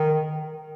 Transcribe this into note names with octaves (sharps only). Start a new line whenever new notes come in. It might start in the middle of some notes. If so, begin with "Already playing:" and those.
Already playing: D#3